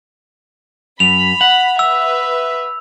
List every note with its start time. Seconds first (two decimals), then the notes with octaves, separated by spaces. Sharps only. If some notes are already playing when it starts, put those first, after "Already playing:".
1.00 F#2 B5 F7
1.41 F#5
1.79 B4 E5 E6